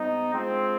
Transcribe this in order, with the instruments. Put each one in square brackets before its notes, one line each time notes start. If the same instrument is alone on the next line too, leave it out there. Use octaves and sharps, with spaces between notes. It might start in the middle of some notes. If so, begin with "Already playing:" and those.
Already playing: [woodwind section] G#2 G3 B3 [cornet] D#4
[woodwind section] F3 G#3 D4 F4 G#4 [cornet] C4